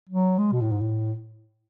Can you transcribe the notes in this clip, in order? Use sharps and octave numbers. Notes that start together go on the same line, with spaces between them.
F#3
G#3
B2
A2
G#2
A2